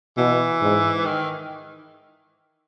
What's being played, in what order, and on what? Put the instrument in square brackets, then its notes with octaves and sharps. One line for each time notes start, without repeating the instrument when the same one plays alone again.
[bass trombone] B2 [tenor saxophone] E3
[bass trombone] G#2
[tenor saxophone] D#3